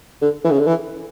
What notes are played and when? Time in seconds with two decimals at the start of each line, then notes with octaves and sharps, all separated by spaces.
0.22 D3
0.44 E3
0.51 C#3
0.59 D3
0.67 E3